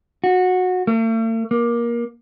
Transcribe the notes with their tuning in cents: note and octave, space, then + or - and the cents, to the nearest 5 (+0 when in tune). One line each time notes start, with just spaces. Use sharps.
F#4 -15
A3 +45
A#3 +20